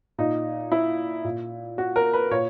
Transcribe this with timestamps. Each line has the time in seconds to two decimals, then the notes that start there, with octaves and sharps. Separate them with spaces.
0.18 A#2 D#4
0.72 E4
1.25 A#2
1.78 F#4
1.96 A#4
2.13 B4
2.31 A#2 C#5